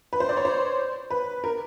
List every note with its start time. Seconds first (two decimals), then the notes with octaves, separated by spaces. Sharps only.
0.13 B4
0.20 C5
0.29 D5
0.37 C#5
0.45 C5
1.11 B4
1.44 A#4